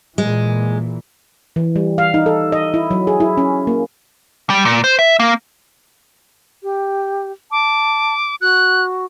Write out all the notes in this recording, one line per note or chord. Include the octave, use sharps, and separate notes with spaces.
A#2 E3 G#3
E3
G3
F5
D#4
A4
D#5
E4
F#3
G#4
E4
C#4
A#3
G3
A#2
C5
E5
A#3
G4
A5 D6
F#4 F#6